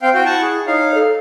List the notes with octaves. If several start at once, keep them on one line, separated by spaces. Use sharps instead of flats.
C4 F5 G5
E4 F#4 G5
F#5 A5 C#6
G#4
D#4 C#5 F5
A4